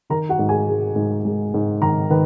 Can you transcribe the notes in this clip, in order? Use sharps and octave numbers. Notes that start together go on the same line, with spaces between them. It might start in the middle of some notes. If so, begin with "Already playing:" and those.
D#3 A#4 A#5
F#4 F#5
G#2
G#4 G#5
G#3
G#2
G#3
G#2
D#3 A#4 A#5
D#3 B4